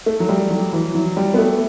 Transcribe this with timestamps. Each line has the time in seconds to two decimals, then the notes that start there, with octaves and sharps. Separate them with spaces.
0.06 A3
0.20 F#3
0.29 G3
0.51 F#3
0.72 E3
0.95 F#3
1.17 G3
1.34 B3
1.38 A3